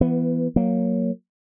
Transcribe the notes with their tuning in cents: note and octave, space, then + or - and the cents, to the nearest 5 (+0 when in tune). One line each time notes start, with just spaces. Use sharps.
E3 +25 B3 +0
F#3 +0 A#3 +0